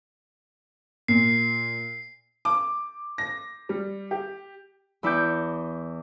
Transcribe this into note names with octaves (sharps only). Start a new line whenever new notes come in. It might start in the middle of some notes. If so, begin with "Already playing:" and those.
A#2 C7
D6
A#6
G3
G4
E2 E4 C#6 D6 G6